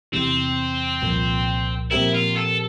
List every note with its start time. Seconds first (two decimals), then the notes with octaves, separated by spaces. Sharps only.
0.12 E2 C3 E3 C4
1.02 C2 A#2 F3 A#3
1.91 A#2 F3 C4 E4 G4 A#4
2.14 F4
2.36 A4